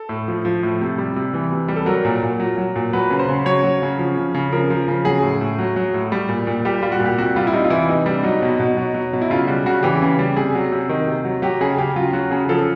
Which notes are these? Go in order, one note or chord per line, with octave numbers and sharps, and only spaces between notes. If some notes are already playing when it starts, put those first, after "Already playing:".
Already playing: A4
A2
F3
F3
A2
C3
G3
C3
E3
C3
G3
A4
F#3 A#4
A#2
A#2
F#3
F#3
A#2
F#3 B4
C#3
C5
C#3
F#3 C#5
F#3
C#3
F3
C#3
C#3
F3 A#4
F3
C#3
F#3 G#4
A2
A2
F#3
F#3
A2
G3
A#2
A#2
G3 G4
G3 F4
F#4
A#2
G4
C3 F#4
G3 F4
E4
C3 D#4
F4
E3 E4
C3 D#4
G3 D4
F#3 D#4
B2
B2
F#3
F#3
B2
E4
C#3 F4
G3 F#4
C#3 F#4
E3 G4
C#3
G3
C3 G#4
F#3
C3
D#3
C3
F#3
F#3 G4
C#3 G#4
C#3 G4
F#3 F4
F#3 F#4
C#3 G#4
F3 A4